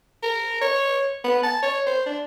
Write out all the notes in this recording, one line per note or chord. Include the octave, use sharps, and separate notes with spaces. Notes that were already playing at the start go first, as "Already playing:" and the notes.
A#4
C#5
B3
A5
C#5
C5
D4